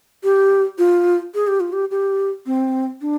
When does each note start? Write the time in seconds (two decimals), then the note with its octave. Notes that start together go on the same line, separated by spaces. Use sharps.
0.24 G4
0.78 F4
1.35 G#4
1.47 G4
1.60 F4
1.73 G4
1.91 G4
2.46 C4
3.01 D4